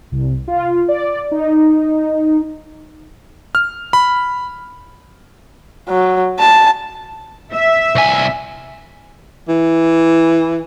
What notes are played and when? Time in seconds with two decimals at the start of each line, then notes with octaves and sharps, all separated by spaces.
0.12 C2
0.48 F4
0.88 D5
1.31 D#4
3.55 F6
3.93 B5
5.89 F#3
6.40 A5
7.52 E5
7.95 C2 G#5
9.49 E3